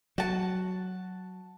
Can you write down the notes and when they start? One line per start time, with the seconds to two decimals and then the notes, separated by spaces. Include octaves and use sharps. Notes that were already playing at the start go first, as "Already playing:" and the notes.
0.18 F#3 F#4 A5